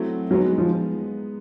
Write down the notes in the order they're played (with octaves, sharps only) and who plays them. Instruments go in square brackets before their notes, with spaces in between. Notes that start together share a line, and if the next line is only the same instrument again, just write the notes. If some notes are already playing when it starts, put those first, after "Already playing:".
Already playing: [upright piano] F#3 A3 C4 E4
[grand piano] F#3 [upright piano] G#3 B3 D#4
[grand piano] F3